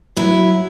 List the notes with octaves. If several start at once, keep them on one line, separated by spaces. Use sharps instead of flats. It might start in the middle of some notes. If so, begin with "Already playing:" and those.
F#3 E4